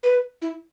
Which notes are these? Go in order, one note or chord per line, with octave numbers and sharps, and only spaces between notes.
B4
E4